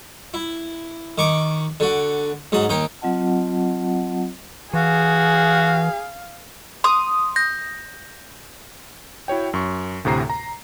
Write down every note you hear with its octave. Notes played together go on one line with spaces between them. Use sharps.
E4
D#3 C#6 D6
D3 F#4
G#2 F#3 D#6
D#2 D#4 G5
F#3 C4 F4 D#5 F#5 A5
E3 F#4 G#4 F5
C6 D#6
G6 A#6
E4 F#4 C#5 G5
F#2 C#6
D2 A2 C3 A#5 C7
A#5